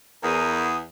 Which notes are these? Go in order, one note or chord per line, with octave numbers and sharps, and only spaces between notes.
E2 A#4 D#6